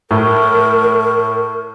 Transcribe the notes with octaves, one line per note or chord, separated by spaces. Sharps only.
A2 A#4